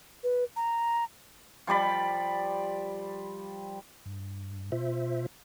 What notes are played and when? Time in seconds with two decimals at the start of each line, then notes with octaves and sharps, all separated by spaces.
0.24 B4
0.56 A#5
1.67 F3 G3 D5 B5
4.06 G2
4.72 B2 F4 C5 E5